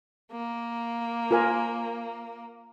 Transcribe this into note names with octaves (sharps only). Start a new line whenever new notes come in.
A#3
F4 A#4 G#5